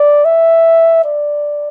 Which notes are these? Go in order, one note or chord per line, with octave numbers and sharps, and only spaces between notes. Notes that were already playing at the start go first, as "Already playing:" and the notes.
Already playing: D5
E5
D5